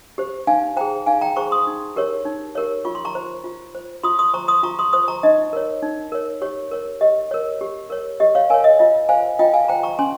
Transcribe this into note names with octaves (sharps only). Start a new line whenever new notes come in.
G4 C5
D#4 F5 G#5
G#4 C5 G5 A#5
D#4 F5 G#5
G5 A#5
G#4 C5 A#5 C#6
C6 D#6
D#4
G4 A#4 C#5
D#4
G4 A#4 C#5
F4 C#6
C6
A#5 C#6
C5
F4
C5
F4 C6 D#6
C6 D#6
C5 A#5 C#6
C6 D#6
F4 A#5 C#6
C6 D#6
C5 C6 D#6
A#5 C#6
D#4 D#5
A#4 C#5
D#4
A#4 C#5
G4 C#5
A#4 C#5
G4 D#5
A#4 C#5
G4
A#4 C#5
G4 D#5
C#5 F5
A#4 C#5 F5 G#5
D#5
F4 D#5
C5 F5 G#5
F4 D#5 G5
F5 G#5
G#5
C5 G5 A#5
A#5 C#6
C#4 G#5 C6